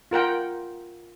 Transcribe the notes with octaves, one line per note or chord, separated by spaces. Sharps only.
F4 A#4 F#5 G5